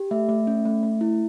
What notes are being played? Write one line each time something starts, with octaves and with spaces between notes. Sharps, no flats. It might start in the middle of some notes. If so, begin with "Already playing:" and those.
Already playing: G4
A3 E5
A3
C#4
A3
A3
E4